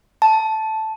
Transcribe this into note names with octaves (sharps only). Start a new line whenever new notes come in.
A5